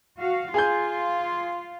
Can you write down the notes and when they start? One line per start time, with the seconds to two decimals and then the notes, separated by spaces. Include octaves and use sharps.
0.18 F#4 F5
0.54 F4 G#4 G#5 G6